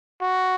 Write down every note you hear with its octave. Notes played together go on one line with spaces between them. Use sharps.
F#4